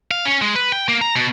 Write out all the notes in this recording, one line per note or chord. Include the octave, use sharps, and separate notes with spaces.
F5
C#4
G#3
B4
G5
A#3
A#5
B2